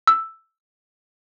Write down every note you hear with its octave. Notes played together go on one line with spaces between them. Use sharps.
E6